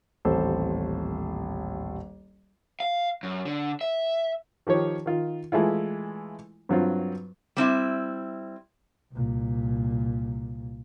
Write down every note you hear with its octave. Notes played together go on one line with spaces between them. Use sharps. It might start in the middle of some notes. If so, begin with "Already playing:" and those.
D#1 A1 C4 A4 C5 E6
F5
F#2
D3
E5
D#3 F3 G4 C#5
D#3 F4
E3 G#3 A3 E4 F4
G2 F#3 C4 F4
G3 C4 E4
C2 A#2